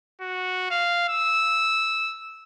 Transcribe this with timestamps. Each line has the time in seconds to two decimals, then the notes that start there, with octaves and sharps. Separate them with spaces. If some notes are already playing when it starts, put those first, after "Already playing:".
0.21 F#4
0.70 F5
1.08 E6